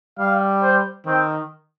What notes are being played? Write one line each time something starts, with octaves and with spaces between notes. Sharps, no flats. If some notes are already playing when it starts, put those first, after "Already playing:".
G3 F5
C5
D#3 C4